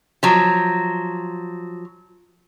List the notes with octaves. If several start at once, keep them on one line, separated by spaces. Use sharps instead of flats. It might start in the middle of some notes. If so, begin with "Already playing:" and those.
F3 F#3